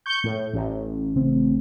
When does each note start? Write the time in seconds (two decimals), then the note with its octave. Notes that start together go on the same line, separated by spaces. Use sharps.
0.06 C#6 G6
0.24 A2
0.53 A1
1.16 C#3 C4